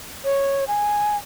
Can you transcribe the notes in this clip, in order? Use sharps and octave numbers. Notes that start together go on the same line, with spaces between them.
C#5
G#5